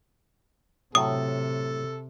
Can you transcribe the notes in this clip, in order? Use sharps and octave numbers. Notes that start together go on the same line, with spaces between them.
A2 C3 F#3 A4 D#6